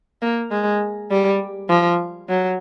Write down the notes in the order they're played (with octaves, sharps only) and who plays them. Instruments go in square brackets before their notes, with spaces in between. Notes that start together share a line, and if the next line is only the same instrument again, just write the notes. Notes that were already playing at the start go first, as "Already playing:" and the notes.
[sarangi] A#3
G#3
G3
F3
F#3